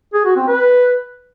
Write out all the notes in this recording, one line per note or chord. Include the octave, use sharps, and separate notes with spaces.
G#4
F#4
C4
B4